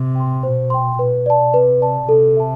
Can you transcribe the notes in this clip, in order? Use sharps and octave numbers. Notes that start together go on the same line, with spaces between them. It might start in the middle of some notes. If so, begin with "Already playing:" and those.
Already playing: C3
G5 C6
B2 C5
G5 C6
B2 B4
D5 A5
C3 B4
D5 A5
C3 A4
E5 A5